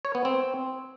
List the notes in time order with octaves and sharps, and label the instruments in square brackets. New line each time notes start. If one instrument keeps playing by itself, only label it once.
[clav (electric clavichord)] C#5
B3
C4